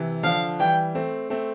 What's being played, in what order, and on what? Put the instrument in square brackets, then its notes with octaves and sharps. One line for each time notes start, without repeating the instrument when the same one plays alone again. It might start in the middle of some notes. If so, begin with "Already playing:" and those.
Already playing: [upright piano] C3 E3
[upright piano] D3 F3 [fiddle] F5
[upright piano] E3 G3 [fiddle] G5
[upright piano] A3 C4
A3 C4